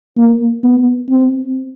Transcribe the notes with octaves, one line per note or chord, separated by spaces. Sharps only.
A#3
B3
C4